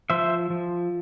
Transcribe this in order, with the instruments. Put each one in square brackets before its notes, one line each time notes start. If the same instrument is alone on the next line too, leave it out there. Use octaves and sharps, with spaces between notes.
[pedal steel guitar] F3 C5 E5
F3